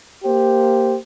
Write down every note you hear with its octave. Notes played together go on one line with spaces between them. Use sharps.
A#3 G4 C5